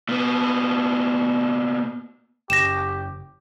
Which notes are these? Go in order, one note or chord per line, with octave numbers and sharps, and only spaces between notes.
A#2 B3
F#1 G4 A#6 E7